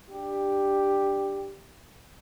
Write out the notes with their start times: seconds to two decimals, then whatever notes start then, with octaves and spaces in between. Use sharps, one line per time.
0.10 D4 G4